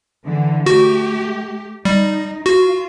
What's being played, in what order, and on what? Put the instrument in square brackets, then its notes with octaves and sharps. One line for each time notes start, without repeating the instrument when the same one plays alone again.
[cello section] D3 E3
[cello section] A3 G4 [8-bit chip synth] F#4
[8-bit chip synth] G3 [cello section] D#4
[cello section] F4 [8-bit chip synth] F#4